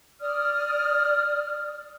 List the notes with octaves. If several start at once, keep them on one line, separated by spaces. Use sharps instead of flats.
D5 D#6 F6